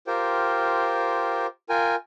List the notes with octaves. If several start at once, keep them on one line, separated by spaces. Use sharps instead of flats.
F4 G4 A#4 C5 G5
F4 A#4 G5 G#5